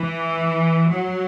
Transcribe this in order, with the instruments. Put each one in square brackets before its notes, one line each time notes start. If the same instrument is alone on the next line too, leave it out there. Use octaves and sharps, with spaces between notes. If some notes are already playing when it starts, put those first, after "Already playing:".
Already playing: [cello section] E3
F#3